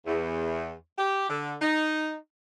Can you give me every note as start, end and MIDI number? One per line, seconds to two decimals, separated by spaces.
0.07 0.72 40
0.98 1.26 67
1.30 1.55 50
1.62 2.15 63